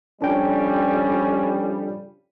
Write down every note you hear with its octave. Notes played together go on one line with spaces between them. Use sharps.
F2 C#3 G3 C#4 D4 G5